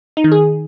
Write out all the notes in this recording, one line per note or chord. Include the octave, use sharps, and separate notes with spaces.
D#4
D#3
G#4